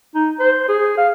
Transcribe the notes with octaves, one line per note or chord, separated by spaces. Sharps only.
D#4
C5
G#4
F5